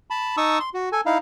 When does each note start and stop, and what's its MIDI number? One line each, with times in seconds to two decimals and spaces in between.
0.10 0.36 81
0.10 0.36 83
0.37 0.59 63
0.37 0.59 81
0.37 0.59 85
0.37 0.59 87
0.37 0.59 88
0.60 0.70 84
0.74 0.89 66
0.92 1.01 69
0.92 1.01 80
1.06 1.18 63
1.06 1.18 64
1.06 1.18 77